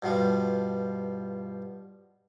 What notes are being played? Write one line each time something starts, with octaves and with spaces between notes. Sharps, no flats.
G2 B2 F3 G3